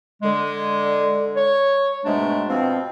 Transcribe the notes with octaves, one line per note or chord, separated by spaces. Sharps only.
D3 G#3
C#5
G#2 B2 G#3 A3 D4
B2 F3 C4